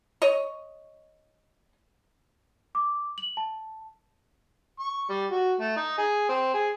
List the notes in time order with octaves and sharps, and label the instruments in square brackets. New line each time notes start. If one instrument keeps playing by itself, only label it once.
[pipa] C#5 D#5
[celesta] D6
F#7
A5
[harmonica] C#6
G3
F#4
A3
D#4
G#4
C4
G#4